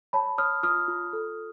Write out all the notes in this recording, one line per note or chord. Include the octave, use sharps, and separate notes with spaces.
C#5 A5 B5
C#5 D#6 F6
F4 D#6 F6
F4
A4